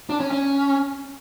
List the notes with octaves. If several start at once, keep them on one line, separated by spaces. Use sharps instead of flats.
D4
C#4
C#4